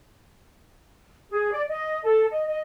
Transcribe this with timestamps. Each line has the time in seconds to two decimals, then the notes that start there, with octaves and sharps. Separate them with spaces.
1.30 G#4
1.51 D5
1.68 D#5
2.04 A4
2.31 D#5
2.46 D#5